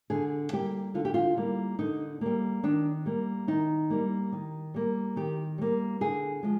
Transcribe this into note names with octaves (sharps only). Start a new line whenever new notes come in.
D3 G#4
G3 A#3 G4
D3 F4
G4
F4
G3 A#3
D3 D#4
G3 A#3
D#3 D4
G3 A#3
D#3 D#4
G3 A#3
D#3
G3 A#3
D#3 G4
G3 A#3
D3 G#4
F3 G#3